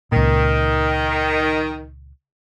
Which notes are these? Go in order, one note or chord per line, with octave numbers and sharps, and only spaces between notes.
C#2 A#2 D#3